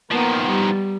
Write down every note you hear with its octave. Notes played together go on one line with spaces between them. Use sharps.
D#3 F3 A#3 B3
G3